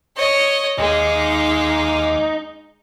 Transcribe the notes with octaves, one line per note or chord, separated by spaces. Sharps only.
C#5 D#5
D#2 G#3 D#4 F5 D6